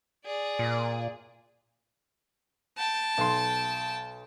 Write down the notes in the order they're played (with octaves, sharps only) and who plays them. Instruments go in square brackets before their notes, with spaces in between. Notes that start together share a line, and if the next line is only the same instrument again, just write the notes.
[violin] G#4 D5
[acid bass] A#2
[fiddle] G5 A5
[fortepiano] B1 C6